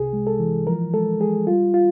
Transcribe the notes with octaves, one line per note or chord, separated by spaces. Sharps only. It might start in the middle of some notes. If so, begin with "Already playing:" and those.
Already playing: C2 C3 G#4
G#3
A4
E3
F3 A#4
G#3 A4
G#3 G#4
G3 F4
F4